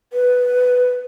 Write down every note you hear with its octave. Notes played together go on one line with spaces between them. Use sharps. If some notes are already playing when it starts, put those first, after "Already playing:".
B4